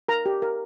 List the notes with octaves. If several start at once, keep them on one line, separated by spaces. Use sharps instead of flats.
A#4 A#5
G4
A#4